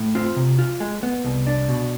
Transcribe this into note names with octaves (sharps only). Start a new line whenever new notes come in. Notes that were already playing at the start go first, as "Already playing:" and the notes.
Already playing: A2
C4 F4
C3
F4
G#3
B3
C2
D4
B2